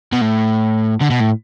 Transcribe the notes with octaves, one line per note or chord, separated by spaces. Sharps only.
B2
A2
D3
B2
A2